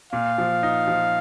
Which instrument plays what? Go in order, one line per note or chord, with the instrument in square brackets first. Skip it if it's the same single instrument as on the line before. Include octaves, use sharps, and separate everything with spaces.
[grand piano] A#2 [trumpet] F5
[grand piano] F3
D#4
F3